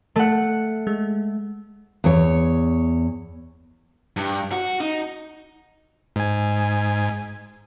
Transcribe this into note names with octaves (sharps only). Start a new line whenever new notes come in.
A3 F#5
G#3
E2 C#5
G2
F#4
D#4
G#2 G#5